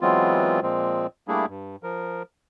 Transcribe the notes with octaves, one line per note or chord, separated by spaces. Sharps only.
E3 F#3 G#3 B3 C4 F4
A#2 F3 G#3 C4
G3 A3 A#3 D4 E4 G#4
G2
F3 A#4